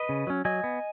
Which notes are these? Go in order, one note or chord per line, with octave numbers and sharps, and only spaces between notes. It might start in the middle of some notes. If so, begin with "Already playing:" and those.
Already playing: B4 D#5
C#3
F#3 C#4
F#3 D#5 G#5
B3